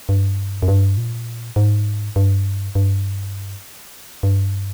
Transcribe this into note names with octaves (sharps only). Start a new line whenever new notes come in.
G2
F#2
G2
A#2
G#2
G2
G2
G2